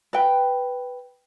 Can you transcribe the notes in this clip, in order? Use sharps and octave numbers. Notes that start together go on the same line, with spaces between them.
B4 G5